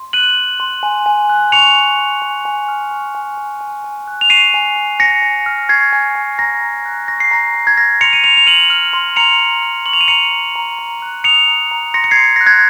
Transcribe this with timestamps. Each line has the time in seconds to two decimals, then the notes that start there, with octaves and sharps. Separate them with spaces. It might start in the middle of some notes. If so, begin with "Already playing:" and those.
Already playing: C6
0.13 F#6 D#7 F#7
0.37 F#6
0.60 C6
0.83 G#5
1.06 G#5
1.29 F#6
1.52 C#6 C#7 F7
1.75 G#5
1.99 G#5
2.22 G#5
2.45 G#5
2.68 F6
2.91 C#6
3.15 G#5
3.38 G#5
3.61 G#5
3.84 G#5
4.08 F#6
4.21 F7
4.30 C#6 C7 D#7
4.54 G#5
4.76 G#5
5.00 G#5 A#6 C#7
5.22 G#5
5.46 F6
5.69 C#6 G#6 C7
5.92 G#5
6.15 G#5
6.38 A#5 A#6
6.61 A#5
6.85 F#6
7.08 C#6 A#6
7.20 C7
7.31 A#5 A#6
7.55 A#5
7.67 G#6
7.77 F6 A#6
8.01 C6 C#7 F7
8.13 D#7
8.24 C6 C#7 F7
8.37 F7
8.47 F6 D#7 F#7
8.70 F6
8.93 C6
9.16 A#5 C#7 F7
9.40 A#5
9.62 F6
9.86 C#6 F#7
9.93 F7
10.01 D#7
10.08 A#5 C#7 F7
10.32 A#5
10.56 A#5
10.79 A#5
11.02 F#6
11.24 D#6 C#7 F7
11.48 A#5
11.71 A#5
11.94 C6 A#6 C#7
12.04 C#7
12.11 G#6 C7
12.17 C6
12.36 F#6 A#6
12.47 G#6